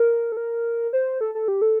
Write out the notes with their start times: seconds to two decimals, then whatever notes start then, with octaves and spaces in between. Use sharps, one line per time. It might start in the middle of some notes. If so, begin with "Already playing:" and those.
Already playing: A#4
0.32 A4
0.37 A#4
0.93 C5
1.21 A4
1.35 A4
1.48 G4
1.62 A4